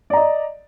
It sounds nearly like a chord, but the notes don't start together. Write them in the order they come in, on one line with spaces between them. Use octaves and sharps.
D5 A#5 D#5